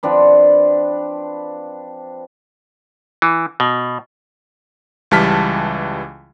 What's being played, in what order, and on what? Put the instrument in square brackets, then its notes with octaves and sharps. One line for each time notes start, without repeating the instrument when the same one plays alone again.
[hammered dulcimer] F3 C4 D4 B4
[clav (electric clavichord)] E3
B2
[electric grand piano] C#2 E3 G3 A5 F6 B6